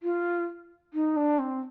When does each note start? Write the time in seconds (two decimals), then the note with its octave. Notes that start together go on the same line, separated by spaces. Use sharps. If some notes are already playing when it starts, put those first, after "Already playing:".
0.03 F4
0.94 D#4
1.16 D4
1.39 C4